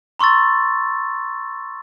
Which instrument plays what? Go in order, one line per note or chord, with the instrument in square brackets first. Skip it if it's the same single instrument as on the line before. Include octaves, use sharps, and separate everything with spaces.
[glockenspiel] A#5 C6 C#6 E6 A6